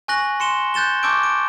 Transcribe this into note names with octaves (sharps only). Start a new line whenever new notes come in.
G#5 C#6 F#6 A#6 F#7
C6 C#7 E7 G7
F#6 G6 A6 E7 G7
A5 C#6 D6 E6 G6 D7
D7